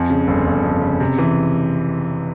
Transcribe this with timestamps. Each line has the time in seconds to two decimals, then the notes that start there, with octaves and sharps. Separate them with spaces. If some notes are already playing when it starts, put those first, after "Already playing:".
Already playing: F2 G#5
0.10 C#3
0.27 G1
0.47 G1
0.64 F2
0.81 C#3
1.00 C3
1.18 E3